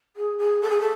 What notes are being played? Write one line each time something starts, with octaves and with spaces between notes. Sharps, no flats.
G#4
G#4
A4
G#4
A4